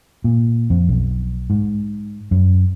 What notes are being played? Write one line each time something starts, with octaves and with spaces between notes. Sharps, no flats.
A#2
F2
B1
G#2
F#2